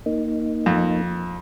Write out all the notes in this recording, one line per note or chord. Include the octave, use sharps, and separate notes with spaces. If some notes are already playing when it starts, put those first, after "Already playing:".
A#3 D#4
F2